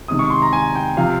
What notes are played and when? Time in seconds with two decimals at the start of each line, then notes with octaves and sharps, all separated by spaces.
0.08 C3 D#3 G#3 C4 D#6
0.19 C#6
0.30 C6
0.42 A#5
0.53 G#5
0.75 G5
0.97 C3 F3 F5